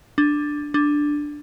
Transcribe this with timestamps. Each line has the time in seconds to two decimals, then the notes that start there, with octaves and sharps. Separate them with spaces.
0.18 D4
0.74 D4